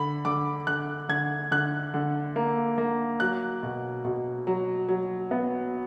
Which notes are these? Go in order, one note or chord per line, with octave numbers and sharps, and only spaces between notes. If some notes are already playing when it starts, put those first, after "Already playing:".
Already playing: D3 B5
D3 D6
D3 F#6
D3 G#6
D3 F#6
D3
A#3
A#3
F#3 F#6
B2
B2
F#3
F#3
B3